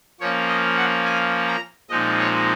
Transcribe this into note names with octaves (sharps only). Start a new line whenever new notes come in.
F3 A#3 C#4 C#5
D#5
F#5
G#5
A#5
A#2 F3 G#3 C4 D#4 D#5
C#5